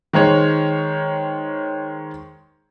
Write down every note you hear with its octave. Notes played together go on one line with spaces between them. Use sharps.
D#3 G#3 C5 C#5